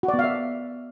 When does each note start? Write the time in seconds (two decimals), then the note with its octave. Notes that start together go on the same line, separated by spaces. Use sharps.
0.03 F#4
0.08 D5
0.14 B3
0.19 F5
0.24 E5